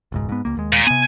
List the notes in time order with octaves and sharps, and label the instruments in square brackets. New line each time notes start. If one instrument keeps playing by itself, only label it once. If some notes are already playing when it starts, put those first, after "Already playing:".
[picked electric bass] E1 C#2 G#2
G#2 B3
C#2 A#3
D#2 G#3
[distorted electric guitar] A#2
[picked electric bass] C3 B3 [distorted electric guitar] G#5